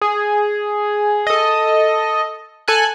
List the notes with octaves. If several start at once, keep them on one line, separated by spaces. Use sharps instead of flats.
G#4
A4 D#5
A4 G#5 F#6